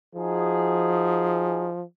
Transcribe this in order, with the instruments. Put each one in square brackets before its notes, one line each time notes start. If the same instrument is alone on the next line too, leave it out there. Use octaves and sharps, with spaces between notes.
[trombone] F3 [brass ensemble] D#4 F#4 G#4